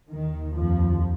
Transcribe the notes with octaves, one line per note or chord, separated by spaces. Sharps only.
D#2 D#3
F2 F3